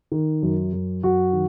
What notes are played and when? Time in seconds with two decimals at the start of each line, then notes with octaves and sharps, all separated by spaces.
0.12 D#3
0.42 F#2
0.73 F#2
1.03 F#2 F#4
1.33 D#3